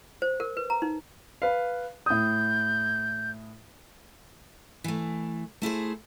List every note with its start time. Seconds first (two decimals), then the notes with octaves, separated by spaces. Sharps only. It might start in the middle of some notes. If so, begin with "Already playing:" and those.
0.22 C5
0.40 A#4
0.57 B4
0.70 A#5
0.82 D#4
1.42 B4 F5
2.06 A2 D#6 G6
4.84 E3 A3
5.62 A3 E4 G#4 C5